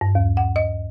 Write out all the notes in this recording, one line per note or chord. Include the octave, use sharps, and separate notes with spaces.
G2
D#2
F#5
D#5